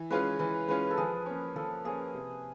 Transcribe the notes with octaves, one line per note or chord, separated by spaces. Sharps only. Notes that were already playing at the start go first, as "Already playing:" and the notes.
Already playing: E3
G#3 C#4 F4 G#4 B4
E3 B4
G#3 C#4 F4 G#4 B4
A4
F3 G#4
A#3 C#4
F3 A4
A#3 C#4 G#4
C3